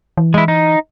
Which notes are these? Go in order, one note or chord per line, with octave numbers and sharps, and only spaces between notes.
E3
G#3 E4
D#4